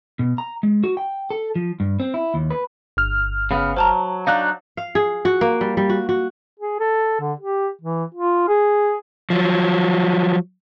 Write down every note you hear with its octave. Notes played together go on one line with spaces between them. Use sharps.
B2
A#5
G#3
F#4
G5
A4
F3
G2
C4
E4
D#2
B4
G1 F6
C#3 B3
F#3 C5 A5 A#5
F#3 D4 D#4 F5 F#6
F5
G#4
F#4
A#3
G3
G3
F#4
F#4
G#4
A4
D3
G4
E3
F4
G#4
F3 F#3